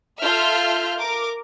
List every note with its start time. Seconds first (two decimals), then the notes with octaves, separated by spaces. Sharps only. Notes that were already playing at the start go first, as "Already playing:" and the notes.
0.22 F4 A4 E5 F6 G6
0.99 A#4 D6